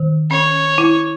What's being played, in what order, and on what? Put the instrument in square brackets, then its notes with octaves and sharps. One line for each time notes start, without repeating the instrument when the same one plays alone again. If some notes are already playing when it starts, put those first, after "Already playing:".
Already playing: [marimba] D#3
[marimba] C#4 [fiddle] C#5
[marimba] E4